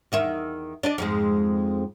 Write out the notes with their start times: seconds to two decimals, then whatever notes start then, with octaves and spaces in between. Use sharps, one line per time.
0.12 E2 D#3 E5
0.83 D4 D5 D#5
0.98 F2 G#2 G#3